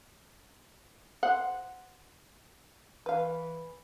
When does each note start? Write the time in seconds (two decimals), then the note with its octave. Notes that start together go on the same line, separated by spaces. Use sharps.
1.23 C5 F#5
3.06 E3 B4 F5